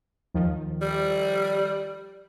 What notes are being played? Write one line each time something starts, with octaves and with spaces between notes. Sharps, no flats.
D#2 D#3 F3
G3